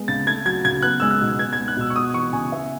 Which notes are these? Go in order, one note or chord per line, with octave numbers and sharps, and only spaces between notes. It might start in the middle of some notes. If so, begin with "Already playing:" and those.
Already playing: G#3 B3
C#3 A6
A3 G#6
F#3 G#6
C#3 G#6
B3 F#6
G#3 E6
F#6
B2
B3 G#6
G#6
G#3
F#6
B2 E6
C#6
B3 D#6
E3 C#6
C#3 G#5
B3 E5